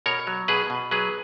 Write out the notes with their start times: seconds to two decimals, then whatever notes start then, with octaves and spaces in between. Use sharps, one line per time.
0.06 B2 A#4 C#5
0.27 F#3
0.48 B2 G#4 B4
0.70 B2
0.91 F#3 G#4 B4